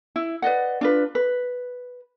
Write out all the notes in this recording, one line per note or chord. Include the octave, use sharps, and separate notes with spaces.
E4
B4 D5 D#5 F#5
D4 F4 B4
B4